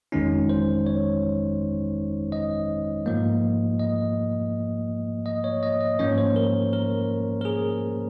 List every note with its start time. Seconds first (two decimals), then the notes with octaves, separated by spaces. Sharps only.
0.12 G1 F2 D#3 G#3 C#4 D#4
0.49 C5
0.86 C#5
2.32 D#5
3.06 G#2 F3 A#3
3.80 D#5
5.26 D#5
5.44 C#5
5.63 D#5
5.81 D#5
5.99 G#2 F3 A#3 C#4 C#5
6.18 C5
6.36 A#4
6.73 A#4
7.41 A#4
7.45 G#4